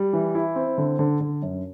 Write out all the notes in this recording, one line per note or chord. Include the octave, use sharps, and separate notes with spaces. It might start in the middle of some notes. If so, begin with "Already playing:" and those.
Already playing: G3
E3
E4
C4
D3
D3
D3
F#2